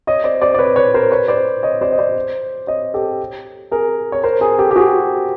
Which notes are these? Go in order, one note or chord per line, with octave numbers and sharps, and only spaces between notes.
C#5 D#5
C5 D5
C5 D5
D5
B4 C#5
B4 C#5
A#4 C5
B4 C#5
C5 D5
C#5 D#5
C5 D5
D#5
C5 D5
C#5 D#5
G4 A4
G#4 A#4
C#5
A#4 C5
G#4 A#4
G4 A4
G4
F#4 G#4